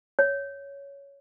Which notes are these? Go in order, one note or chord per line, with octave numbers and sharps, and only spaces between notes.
C#5